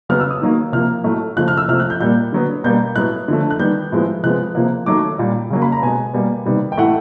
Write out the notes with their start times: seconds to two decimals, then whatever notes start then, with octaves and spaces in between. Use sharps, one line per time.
0.09 C#3 F#3 B3 F6
0.20 E6
0.31 D#6
0.42 D#3 F#3 A#3
0.72 C3 F3 A#3 F6
1.04 A2 F#3 A3
1.36 C#3 F3 A3 F#6
1.48 F6
1.57 E6
1.68 C3 F3 A3 F6
1.80 F#6
1.90 G6
2.00 A#2 G3 A#3 G6
2.33 D3 F#3 B3
2.64 B2 G3 A#3 G6
2.95 A2 F#3 B3 F#6
3.28 D3 F3 A3
3.51 F#6
3.59 D#3 G3 B3 G6
3.92 A2 F3 G#3 B3
4.23 C3 F3 G#3 B3 F#6
4.55 C3 F3 A#3
4.86 D#3 F#3 A3 D6
5.18 A#2 G3 A#3
5.50 C#3 F#3 A#3
5.62 B5
5.72 A#5
5.83 B2 G#3 B3 G#5
6.14 B2 G3 A#3
6.46 C3 D#3 G3 B3
6.72 G5
6.78 A2 E3 A3 F#5